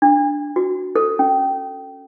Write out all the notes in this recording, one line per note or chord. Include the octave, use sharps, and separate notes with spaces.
D4
F#4
A4
C#4